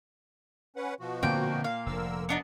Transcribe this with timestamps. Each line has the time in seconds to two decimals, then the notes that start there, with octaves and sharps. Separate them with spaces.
0.76 C#4 B4 F#5
1.00 B2 F3 F#4
1.23 A#2 D3 A#3 C4 G5
1.64 F5
1.86 F1 D3 F3 A#4 E6
2.29 F#2 B3 D4 D#4